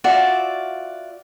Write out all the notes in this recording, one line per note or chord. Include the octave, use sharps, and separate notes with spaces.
F4 F#4 D5 E5